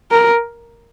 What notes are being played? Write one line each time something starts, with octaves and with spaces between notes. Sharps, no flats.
A#4